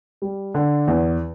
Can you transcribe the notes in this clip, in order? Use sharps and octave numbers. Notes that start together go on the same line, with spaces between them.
G3
D3
E2